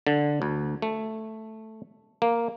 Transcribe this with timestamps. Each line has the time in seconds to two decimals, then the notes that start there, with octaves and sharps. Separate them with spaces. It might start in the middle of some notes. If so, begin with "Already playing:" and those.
0.07 D3
0.42 D2
0.82 A3
2.22 A#3